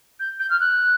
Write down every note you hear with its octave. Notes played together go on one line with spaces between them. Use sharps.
G6
G6
F6
F#6